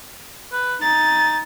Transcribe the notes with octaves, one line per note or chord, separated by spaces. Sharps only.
B4
D#4 A6